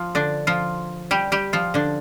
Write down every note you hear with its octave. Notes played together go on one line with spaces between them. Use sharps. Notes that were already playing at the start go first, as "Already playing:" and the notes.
Already playing: F3 F4
D3 D4
F3 F4
G3 G4
G3 G4
F3 F4
D3 D4